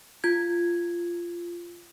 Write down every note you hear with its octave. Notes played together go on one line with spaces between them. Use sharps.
F4 G#6